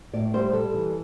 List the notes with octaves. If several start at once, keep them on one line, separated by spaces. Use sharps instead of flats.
A2 D5
G3 C5
G3 A4
E3